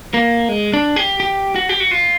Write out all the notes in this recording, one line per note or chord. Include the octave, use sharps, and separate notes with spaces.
A#3
G#3
D4
G4
G4
F#4
G4
F#4
F4